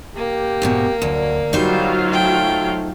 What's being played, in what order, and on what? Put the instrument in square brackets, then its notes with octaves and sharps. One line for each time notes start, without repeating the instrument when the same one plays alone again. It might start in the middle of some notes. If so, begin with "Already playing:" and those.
[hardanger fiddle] A#3 [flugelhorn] G4
[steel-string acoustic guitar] D2 G#2 B2
[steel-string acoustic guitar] D2 [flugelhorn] F#3
[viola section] F#3 F4 F5 [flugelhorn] G3 [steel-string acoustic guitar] D#4 C5
[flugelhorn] A3 [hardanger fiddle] G5